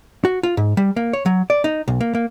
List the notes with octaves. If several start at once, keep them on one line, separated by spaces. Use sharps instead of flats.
F#4
F4
G#2
G3
A#3
C#5
F#3
D5
D#4
B1
A#3
A#3